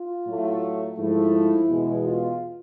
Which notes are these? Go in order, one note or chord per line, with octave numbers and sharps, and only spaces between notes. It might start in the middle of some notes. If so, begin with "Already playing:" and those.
Already playing: F4
A2 F#3 A3
G#2 F3 A3 E4
E2 B2 G#3
F4